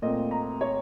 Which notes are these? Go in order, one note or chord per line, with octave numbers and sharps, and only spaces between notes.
A#2 A3 C4 D#5
A#5
C#5